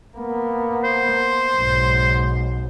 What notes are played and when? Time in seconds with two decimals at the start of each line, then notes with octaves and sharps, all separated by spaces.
0.17 A#3 B3
0.84 C5
1.56 B1 G#2